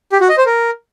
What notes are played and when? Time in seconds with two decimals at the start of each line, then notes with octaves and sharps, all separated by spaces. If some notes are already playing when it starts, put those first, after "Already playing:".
0.12 G4
0.21 F#4
0.29 D#5
0.38 C5
0.46 A#4